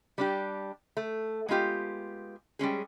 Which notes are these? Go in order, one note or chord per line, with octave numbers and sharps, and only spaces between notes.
G3 D4 G4
A3
G#3 B3 F4 G4
G3 G#3 C#4 G#4